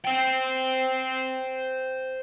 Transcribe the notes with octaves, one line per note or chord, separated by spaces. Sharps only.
C5 G5